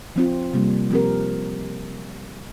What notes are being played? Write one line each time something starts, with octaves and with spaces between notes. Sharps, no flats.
F3 C4 F4
C3 G3 A#3
F3 C4 G4 A#4